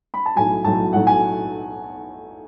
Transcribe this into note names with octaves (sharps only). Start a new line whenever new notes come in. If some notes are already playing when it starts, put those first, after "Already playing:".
B5
A5
B1 A2 F#3 G#5
B1 A2 F#3 A5
B1 A2 F#3 F#5
G#5